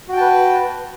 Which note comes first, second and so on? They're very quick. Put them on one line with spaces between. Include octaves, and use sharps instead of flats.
F#4 G5 A5 B4